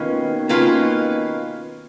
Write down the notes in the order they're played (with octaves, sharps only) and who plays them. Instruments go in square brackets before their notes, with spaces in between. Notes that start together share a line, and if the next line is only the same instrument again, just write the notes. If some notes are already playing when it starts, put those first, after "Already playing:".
Already playing: [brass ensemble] B2 D#3 [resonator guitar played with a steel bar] A#3 C#4 F4 B4
[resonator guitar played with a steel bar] A#3 C#4 F4 B4